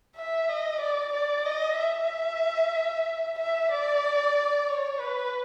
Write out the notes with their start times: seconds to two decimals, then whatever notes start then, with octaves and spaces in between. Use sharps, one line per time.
0.16 E5
0.49 D#5
0.81 D5
1.13 D5
1.46 D#5
1.77 E5
3.38 E5
3.72 D5
4.68 C#5
5.00 B4